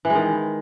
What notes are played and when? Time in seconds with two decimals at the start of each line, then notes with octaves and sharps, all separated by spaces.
0.05 E3
0.10 G#3
0.15 D#3